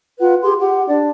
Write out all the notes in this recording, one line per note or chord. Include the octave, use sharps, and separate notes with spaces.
F4 B4 F#5
G4 G#4 C6
G4 F#5
D4 D5